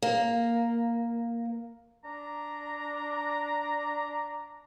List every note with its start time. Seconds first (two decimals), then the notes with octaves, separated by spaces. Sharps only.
0.02 A#3
2.03 D4 A#5